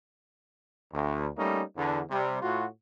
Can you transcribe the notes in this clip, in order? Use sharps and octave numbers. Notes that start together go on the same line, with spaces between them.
D2
G3 A3 A#3 C#4 D#4
E2 D3
C3 G3
A2 F4 F#4